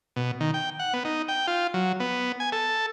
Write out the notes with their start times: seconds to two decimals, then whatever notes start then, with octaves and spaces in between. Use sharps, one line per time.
0.16 B2
0.41 D#3
0.54 G5
0.79 F#5
0.94 B3
1.05 D#4
1.28 G5
1.47 F4
1.74 F#3
2.00 B3
2.40 G#5
2.52 A4